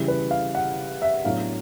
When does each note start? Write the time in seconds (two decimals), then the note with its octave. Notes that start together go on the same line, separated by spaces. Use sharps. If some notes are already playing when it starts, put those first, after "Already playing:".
Already playing: C#3 E3 G3
0.08 B4
0.31 F5
0.55 F#5
1.02 E5
1.24 A2 F#3 B3 D4 F5